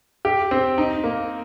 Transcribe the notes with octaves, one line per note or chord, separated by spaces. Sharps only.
G4
C4
D#4
A#3